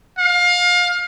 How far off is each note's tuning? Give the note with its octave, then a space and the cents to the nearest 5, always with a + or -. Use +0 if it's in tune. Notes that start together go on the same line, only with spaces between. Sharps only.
F5 +30